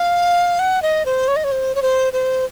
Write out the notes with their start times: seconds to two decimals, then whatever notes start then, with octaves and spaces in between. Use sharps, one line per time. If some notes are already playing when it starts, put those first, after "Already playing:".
Already playing: F5
0.59 F#5
0.82 D#5
1.06 C5
1.28 C#5
1.36 D#5
1.44 C#5
1.52 C5
1.75 C#5
1.82 C5
2.13 C5